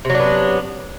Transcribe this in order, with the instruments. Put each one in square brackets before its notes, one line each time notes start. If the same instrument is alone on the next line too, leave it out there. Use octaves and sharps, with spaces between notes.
[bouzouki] C3
F#3
D4
B3